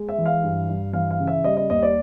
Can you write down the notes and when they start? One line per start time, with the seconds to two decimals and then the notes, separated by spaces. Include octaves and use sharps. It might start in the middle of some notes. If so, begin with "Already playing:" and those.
Already playing: G#3
0.09 E5
0.18 E3
0.26 F5
0.43 G2
0.68 G2
0.93 E3 F5
1.11 F5
1.19 C#3
1.27 E5
1.44 G3 D#5
1.57 D#5
1.70 D#2 D#5
1.82 D5